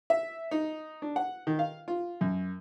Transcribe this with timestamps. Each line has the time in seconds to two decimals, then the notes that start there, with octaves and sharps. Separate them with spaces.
0.10 E5
0.51 D#4
1.02 D4
1.16 F#5
1.47 D#3
1.59 F5
1.88 F4
2.21 F#2